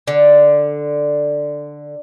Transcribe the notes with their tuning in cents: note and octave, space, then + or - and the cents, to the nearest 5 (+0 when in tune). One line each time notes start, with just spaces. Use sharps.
D3 +5